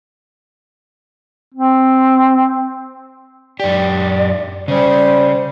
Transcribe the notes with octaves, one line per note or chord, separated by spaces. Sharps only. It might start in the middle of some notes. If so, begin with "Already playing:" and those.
C4
F#2 G4 D5
C#3 G3 C#4 C5